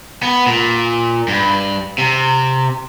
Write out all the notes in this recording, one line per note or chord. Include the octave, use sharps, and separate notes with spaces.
B3
A#2
G2
C3